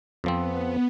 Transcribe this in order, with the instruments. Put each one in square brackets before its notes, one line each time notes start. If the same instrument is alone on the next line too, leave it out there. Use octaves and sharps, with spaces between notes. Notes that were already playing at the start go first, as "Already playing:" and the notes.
[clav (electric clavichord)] F2 F3 C4 [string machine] B3